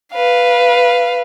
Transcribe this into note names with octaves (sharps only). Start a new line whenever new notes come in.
B4 F5